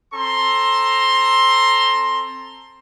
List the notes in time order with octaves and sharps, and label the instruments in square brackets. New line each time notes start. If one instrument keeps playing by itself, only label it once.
[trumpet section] C4 A4 A#5 C6